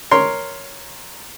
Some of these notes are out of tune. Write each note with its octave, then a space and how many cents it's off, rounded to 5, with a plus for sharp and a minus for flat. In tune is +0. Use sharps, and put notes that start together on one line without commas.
A#4 +0 C#5 +0 C6 +0